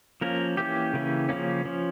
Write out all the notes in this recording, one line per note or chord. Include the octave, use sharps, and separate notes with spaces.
F3 A#3 C#4 A#4
E3 A#3 C#4 G4
C#3 E3 A#3 C#4
C#3 F3 A#3 C#4
F3 C#4